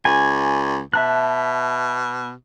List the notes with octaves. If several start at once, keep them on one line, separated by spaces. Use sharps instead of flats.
C#2 G#5
B2 E5 A5 F#6